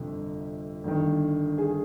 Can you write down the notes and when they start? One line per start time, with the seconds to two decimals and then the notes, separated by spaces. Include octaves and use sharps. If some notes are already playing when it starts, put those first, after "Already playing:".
Already playing: G1 F2 C3
0.84 G1 G2 D#3
1.58 G#4